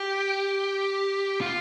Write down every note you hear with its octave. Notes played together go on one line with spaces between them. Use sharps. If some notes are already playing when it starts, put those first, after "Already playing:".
Already playing: G4
F4